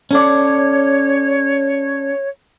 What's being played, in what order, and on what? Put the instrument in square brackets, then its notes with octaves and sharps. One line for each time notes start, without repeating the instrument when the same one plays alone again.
[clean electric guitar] C#4 A4 D5 [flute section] C#5